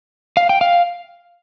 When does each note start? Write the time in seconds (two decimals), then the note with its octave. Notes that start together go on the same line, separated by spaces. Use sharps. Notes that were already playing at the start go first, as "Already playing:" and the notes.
0.37 F5
0.49 G5
0.61 F5